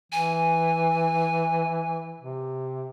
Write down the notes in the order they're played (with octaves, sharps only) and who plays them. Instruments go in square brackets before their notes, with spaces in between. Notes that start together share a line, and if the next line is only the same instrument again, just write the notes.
[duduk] E3 [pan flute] G#5
[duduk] C3